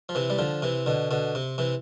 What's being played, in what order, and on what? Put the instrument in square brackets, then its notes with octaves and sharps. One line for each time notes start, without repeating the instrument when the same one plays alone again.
[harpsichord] F3
C3 E3
G3
D3 F3
C3 E3
B2 D3
B2 D3
C3
C3 E3